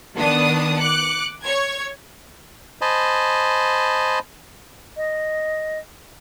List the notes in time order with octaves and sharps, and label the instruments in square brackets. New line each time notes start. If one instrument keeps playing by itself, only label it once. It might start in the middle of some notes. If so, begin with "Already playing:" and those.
[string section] D#3 B3 D4 A5 D#6
D6 F#6 C#7
C#5 G#6
[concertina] C5 D#5 G#5 A5 B5
[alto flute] D#5